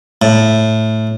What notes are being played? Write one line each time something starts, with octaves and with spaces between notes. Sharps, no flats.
A2